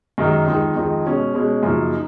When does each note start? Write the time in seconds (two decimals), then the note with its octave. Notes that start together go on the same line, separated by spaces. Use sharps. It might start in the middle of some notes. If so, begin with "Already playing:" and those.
0.18 F#2 D#3 G#3 D#4
0.47 F2 D#3 G#3 D#4
0.76 F2 D#3 G#3 D#4
1.05 B2 G#3 C#4
1.34 B2 G#3 C#4
1.63 F#2 C#3 F3 A#3 D#4
1.92 D#4